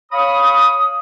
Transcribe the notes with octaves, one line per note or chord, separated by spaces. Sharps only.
C#5 F5 B5 D#6